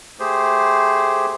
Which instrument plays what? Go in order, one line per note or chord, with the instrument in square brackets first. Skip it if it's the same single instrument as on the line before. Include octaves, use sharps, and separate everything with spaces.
[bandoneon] A3 G4 G#4 C5